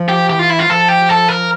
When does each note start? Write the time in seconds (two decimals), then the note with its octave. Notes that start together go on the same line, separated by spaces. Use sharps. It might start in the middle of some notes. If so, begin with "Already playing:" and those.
Already playing: F3
0.09 G4
0.30 E3 G4
0.39 F4
0.50 E4
0.59 F4
0.69 F3 A4
0.88 G4
1.09 A4
1.29 A#4